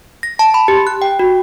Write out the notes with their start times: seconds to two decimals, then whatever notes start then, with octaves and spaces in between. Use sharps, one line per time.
0.23 A#6
0.39 A5
0.54 B5
0.68 G4
0.87 F#6
1.02 G5
1.19 F#4